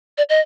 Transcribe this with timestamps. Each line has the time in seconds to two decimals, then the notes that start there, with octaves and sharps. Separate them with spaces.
0.18 D5
0.29 D#5